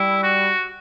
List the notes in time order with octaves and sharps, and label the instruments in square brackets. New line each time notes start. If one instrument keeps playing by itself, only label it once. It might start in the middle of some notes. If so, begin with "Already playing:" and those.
Already playing: [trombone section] G3 [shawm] E4
[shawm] F#4